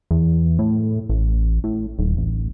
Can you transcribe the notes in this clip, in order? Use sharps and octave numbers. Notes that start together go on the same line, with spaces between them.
E2
A2
A1
A2
D#1
A1